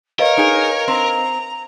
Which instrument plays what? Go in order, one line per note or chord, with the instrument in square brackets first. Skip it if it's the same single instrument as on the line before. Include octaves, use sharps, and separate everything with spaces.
[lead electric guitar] A#4 [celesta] B4 D#5 F5 [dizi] C#5
[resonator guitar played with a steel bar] D#4 G#4
[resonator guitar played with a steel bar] C4 [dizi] A#5